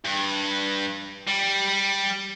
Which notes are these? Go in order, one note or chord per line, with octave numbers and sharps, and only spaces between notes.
G2
G3